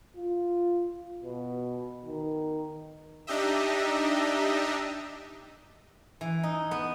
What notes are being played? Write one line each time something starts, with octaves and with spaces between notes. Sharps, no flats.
F4
B2
D#3
D4 D#4 G4 D#5 E5
E3
D#4
B3